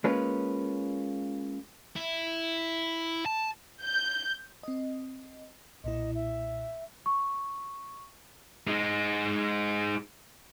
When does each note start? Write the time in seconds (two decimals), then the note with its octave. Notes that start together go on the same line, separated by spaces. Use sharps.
0.04 G#3 A#3 C#4 F4 B4
1.96 E4
3.26 A5
3.83 G6
4.63 C4 D#5
5.84 B1 A#2 E4 D#5
6.15 E5
7.06 C#6
8.67 G#3 D#4